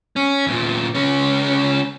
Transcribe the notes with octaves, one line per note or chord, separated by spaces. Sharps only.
C#4
E2 A#2
C#2 C#4